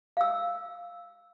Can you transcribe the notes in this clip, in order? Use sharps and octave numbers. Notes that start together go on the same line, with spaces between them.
F5 E6